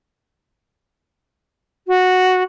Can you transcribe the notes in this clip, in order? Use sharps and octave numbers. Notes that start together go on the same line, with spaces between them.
F#4